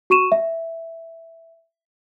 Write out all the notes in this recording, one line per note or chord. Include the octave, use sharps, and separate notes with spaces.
F#4 C#6 D#7 E7
E5